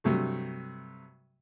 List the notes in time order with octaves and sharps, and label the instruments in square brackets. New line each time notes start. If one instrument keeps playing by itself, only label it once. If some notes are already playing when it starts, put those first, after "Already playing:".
[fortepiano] G2 C3 F#3 A3